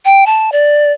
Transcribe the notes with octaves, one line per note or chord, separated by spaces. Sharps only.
G5
A5
D5